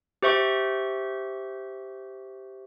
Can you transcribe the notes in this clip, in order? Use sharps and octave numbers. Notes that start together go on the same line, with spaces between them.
G4 C5 E5 C#6